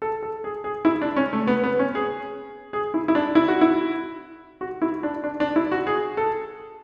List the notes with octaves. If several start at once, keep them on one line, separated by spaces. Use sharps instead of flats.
A4
A4
G#4
G#4
E4
D4
C#4
A3
B3
B3
C#4
G#4
G#4
E4
E4
D4
E4
F#4
E4
F#4
E4
D4
D4
D4
E4
F#4
G#4
A4